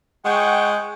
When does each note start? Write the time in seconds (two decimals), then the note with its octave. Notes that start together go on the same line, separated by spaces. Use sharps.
0.25 G#3 F#5 G5 C#6